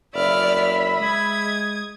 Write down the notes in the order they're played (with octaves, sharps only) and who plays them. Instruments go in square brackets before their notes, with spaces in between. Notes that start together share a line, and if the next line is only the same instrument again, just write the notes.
[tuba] F#1 [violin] D5 F6 [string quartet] E5 B5
[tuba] G#3 [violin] D#6 G#6